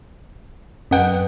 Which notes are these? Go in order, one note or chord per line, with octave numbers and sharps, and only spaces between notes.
F#2 F#3 B4 F#5 G5